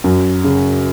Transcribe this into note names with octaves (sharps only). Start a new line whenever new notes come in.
F#2
C#3